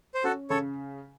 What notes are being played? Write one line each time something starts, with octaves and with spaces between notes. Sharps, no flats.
C5
C#4 F#4 A4
C#3 A4 C#5